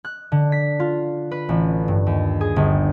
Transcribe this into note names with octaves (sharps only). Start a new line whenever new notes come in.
F#6
D3
B6
F4
B4
A1
G2
D#2
G#4
G1